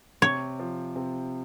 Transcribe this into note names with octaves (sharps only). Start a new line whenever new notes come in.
C3 C#5
F3
C3